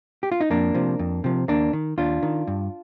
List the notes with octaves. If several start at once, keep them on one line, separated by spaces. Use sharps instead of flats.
G4
F4
D#4
F2 A#3 D4
C3 F3
F2
C3 F3
D#2 A#3 D4
D#3
D#2 D4 F4
D#3
G2